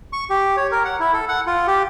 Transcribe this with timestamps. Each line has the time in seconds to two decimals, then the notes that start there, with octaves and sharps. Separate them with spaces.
0.13 C#6
0.30 G4
0.57 C#5
0.72 A#4
0.85 F#5
1.00 E4
1.14 A4
1.28 F#5
1.47 F4
1.67 G4